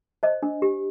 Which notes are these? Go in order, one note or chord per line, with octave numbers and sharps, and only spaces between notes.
C5 D#5
D4
G4